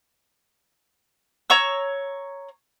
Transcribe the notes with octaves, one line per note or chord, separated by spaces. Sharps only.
C#5 A#5 C#6 E6